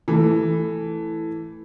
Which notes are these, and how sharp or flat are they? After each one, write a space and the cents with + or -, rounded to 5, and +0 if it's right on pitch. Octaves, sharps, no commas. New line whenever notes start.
E3 +0 A3 +0